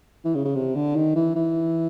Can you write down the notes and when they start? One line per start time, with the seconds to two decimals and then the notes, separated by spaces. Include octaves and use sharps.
0.25 E3
0.35 C#3
0.45 C#3
0.55 C3
0.75 D3
0.95 D#3
1.15 E3
1.36 E3